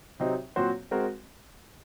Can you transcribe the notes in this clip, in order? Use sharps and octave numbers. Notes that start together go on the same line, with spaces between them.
C3 F#3 C4 D#4
A#2 F#3 C4 F#4 C5
G#3 C4 F#4 A#4